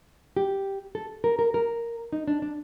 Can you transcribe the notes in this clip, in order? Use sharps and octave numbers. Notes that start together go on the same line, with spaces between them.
G4
A4
A#4
A#4
A#4
D#4
D4
D4